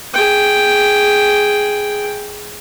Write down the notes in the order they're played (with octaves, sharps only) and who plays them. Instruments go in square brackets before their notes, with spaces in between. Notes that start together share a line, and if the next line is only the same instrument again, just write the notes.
[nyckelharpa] G#4 G5